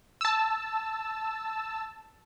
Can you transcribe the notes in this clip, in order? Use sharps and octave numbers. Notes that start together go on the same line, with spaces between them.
A5 E6